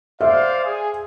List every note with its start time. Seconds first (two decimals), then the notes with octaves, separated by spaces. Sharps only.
0.21 C5 D5 E5 F5
0.65 G#4